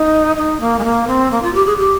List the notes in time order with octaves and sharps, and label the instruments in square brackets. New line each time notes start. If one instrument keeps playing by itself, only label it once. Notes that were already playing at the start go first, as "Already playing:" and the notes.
Already playing: [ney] D#4
D#4
A#3
G#3
A#3
C4
A#3
F4
G4
G#4
G4